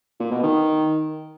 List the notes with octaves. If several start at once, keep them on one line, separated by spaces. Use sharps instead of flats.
A#2
B2
D#3